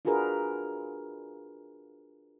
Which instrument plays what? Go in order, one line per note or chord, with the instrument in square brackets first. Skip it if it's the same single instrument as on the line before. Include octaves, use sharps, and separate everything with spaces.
[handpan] D4 F4 F#4 G#4 A#4 B4